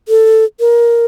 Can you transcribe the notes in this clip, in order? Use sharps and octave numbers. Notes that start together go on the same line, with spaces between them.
A4
A#4